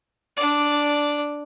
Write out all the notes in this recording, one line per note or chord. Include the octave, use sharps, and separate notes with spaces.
D4 D5